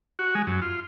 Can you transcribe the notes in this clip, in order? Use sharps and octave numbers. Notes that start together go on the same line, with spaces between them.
F#4
G#3
F#2
F4